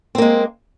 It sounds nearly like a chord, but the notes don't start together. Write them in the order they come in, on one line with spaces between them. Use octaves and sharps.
C4 A#3 G#3